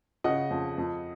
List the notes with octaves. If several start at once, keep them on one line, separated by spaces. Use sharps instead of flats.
C#3 D#5 F#5
F2
F2